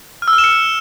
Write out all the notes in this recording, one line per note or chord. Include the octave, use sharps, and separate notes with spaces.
F6
E6
F6
E7
C#7